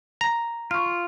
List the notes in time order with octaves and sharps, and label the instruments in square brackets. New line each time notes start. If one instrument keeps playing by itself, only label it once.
[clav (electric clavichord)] A#5
[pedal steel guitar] F4 [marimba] C#6 F6